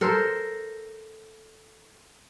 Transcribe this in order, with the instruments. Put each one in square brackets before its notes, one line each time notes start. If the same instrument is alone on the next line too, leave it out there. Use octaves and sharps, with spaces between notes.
[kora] A4 A#4 C5